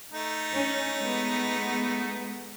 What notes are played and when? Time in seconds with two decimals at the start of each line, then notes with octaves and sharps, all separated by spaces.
0.11 A3 D#4
0.53 C#4
1.00 G#3 B3